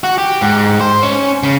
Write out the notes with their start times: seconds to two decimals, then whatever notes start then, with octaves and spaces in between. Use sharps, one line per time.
0.04 F#4
0.18 G4
0.41 G#2
0.81 C5
1.03 C#4
1.43 C#3